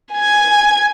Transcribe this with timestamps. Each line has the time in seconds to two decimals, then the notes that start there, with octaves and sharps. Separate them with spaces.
0.13 G#5 G#6